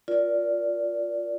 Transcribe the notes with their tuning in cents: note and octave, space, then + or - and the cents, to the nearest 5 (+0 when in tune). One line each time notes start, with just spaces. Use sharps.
F4 +0 A#4 +25 D5 -15